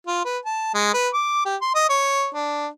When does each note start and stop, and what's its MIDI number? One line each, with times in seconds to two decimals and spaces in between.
0.07 0.21 65
0.25 0.38 71
0.46 0.74 81
0.74 0.91 56
0.94 1.08 71
1.14 1.42 86
1.45 1.56 67
1.62 1.74 84
1.75 1.87 75
1.89 2.29 73
2.34 2.67 62